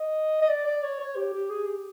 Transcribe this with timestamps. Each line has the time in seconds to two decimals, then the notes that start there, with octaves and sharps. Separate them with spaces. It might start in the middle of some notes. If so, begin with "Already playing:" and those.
Already playing: D#5
0.42 D#5
0.49 D5
0.66 D5
0.83 C#5
1.00 C#5
1.16 G4
1.33 G4
1.50 G#4
1.67 G4